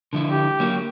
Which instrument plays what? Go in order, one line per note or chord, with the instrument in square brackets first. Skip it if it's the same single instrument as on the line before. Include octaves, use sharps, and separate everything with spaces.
[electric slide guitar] D3 F3 E4
[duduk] G4
[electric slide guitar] F#3 A#3